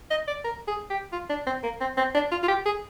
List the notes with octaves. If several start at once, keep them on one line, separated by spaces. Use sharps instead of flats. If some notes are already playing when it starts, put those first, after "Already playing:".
D#5
D5
A#4
G#4
G4
F4
D4
C4
A#3
C4
C4
D4
F4
F4
G4
G#4